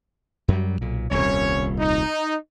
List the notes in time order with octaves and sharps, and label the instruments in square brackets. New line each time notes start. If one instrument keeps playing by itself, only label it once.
[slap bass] F#2 F#3 G3
B1 A#2
[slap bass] D#1 C2 [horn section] C#4 C#5
[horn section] D#4